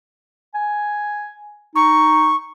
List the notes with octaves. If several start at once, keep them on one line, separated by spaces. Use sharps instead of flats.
G#5
D#4 C#6